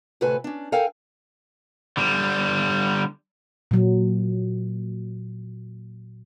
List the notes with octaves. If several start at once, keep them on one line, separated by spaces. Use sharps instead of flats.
D2 A2 C3 A4 B4 G#5
C#4 D4
A4 A#4 F5 G5 G#5
D3 G3
A#2 F#3